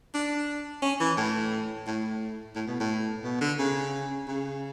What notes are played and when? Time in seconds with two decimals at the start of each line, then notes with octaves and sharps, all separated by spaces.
0.14 D4
0.82 C#4
1.00 E3
1.17 A2
1.87 A2
2.55 A2
2.68 B2
2.80 A2
3.24 B2
3.41 D3
3.59 C#3
4.28 C#3